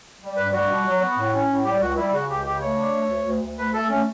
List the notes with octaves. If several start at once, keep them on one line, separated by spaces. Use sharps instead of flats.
G3
G2 B4
G3 F#4
B2
F#3
B3
A2
C#4
A2
G3 G4
C#2 F#4
G3 E4
C#3 F#4
C#2 G4
C#3 G4
A3 C#5
D4
A3
D2
D2
D2
A3 B4
A3 A4
A3 C#4